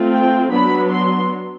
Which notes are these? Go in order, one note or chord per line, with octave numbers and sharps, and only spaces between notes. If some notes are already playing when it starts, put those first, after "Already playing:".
Already playing: A3 C4 F4
G5
F#3 B3 D4 B5
C6